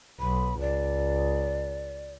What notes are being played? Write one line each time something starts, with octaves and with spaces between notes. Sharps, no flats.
B1 B5
C#2 D5